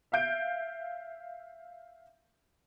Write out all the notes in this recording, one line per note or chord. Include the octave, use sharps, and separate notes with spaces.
E5 F5 G6 D7